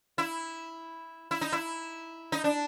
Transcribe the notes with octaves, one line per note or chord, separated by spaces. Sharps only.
E4
E4
D#4
E4
D#4
D4